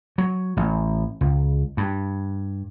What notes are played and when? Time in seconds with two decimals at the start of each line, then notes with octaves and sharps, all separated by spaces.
0.18 F#3
0.57 A1
1.21 C#2
1.77 G2